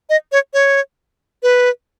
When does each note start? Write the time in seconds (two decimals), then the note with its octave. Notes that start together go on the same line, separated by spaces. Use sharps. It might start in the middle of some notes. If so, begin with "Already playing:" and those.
0.10 D#5
0.32 C#5
0.54 C#5
1.43 B4